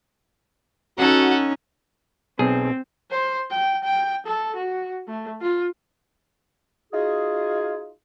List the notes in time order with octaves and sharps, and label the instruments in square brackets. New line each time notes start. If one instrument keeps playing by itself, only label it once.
[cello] C#4 D#4 [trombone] F#4 [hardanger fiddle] A4 F#5
[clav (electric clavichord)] B1 G#4 [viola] C4
[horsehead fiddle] C5
G5
G5
A4
F#4
A3
F4
[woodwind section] D#4 F4 F#4 G#4